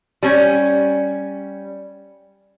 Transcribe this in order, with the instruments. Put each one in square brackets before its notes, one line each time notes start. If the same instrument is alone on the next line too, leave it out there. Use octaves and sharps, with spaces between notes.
[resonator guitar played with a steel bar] G3 C#4